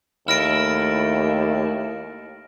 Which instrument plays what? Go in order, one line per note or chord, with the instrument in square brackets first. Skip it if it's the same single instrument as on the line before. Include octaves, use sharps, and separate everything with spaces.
[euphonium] D#2 [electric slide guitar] A3 E4 [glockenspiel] F6 A#6 D7